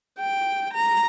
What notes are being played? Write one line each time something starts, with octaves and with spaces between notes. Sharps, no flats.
G5
A#5